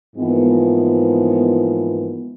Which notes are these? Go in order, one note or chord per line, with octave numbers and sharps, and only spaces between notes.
G#2 E3 F3 G#3 A#3 B3